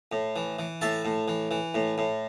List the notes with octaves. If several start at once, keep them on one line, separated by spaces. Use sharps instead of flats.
A2
E3
E3
A2 E5 A5
A2
E3
E3
A2
A2